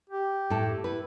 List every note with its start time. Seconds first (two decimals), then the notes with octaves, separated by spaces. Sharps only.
0.10 G4
0.50 A2 A4
0.84 E4 B4